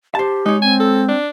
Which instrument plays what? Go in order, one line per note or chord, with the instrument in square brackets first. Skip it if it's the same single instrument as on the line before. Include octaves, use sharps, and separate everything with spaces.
[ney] G4 [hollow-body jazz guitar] C5 A5
[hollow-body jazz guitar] G#3 C#5 [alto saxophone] D#4
[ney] C4 [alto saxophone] G#5
[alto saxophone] A4
D4